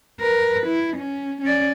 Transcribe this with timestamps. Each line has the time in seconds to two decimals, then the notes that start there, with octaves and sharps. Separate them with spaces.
0.21 A#4 B4
0.67 E4
0.97 C#4
1.42 C#4 D5